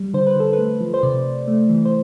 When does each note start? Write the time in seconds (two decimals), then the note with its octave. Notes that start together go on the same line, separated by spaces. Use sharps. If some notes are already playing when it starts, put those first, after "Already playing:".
Already playing: G3
0.14 D3 C5
0.27 B4
0.36 D3 A4
0.53 B4
0.59 A3
0.81 F3
0.94 C5
1.03 C3 D5
1.25 C3
1.48 A3
1.69 E3
1.85 C5